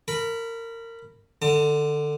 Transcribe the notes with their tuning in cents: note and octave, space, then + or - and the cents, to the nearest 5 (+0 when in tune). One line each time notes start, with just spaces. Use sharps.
A#4 -25 B5 +0
D3 +15 A5 +45